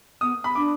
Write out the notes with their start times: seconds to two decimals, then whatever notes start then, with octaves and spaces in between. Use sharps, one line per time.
0.21 B3 D#6
0.44 B5
0.55 D4 D6